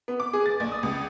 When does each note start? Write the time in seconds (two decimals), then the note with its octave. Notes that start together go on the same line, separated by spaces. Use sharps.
0.08 B3
0.20 D6
0.33 G#4
0.46 A6
0.60 A#1
0.72 D#6
0.83 C#2